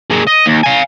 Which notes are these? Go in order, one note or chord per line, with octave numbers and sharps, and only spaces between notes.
A#3 G#4
D#5
D#2
F5 G#5